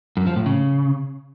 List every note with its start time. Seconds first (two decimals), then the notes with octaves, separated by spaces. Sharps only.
0.17 F#2
0.27 F3
0.36 A2
0.46 C#3